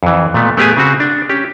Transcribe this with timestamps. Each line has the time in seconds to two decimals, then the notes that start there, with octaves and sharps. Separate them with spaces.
0.03 F2 E3
0.34 A#2 A3 B3
0.57 A3 B3 G4 G#4 G#5
0.77 C#3 C4 F#4
1.00 D4
1.29 C#4 G4